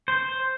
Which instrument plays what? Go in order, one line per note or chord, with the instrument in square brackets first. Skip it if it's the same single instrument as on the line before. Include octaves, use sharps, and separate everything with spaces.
[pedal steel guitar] C5